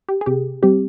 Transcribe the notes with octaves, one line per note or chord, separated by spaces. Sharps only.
G4
G#4
C3 G4
G3 C4 G4